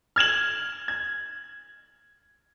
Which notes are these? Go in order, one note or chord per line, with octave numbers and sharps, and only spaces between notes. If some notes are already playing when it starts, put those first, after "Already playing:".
F6 G#6 E7 F#7
G#6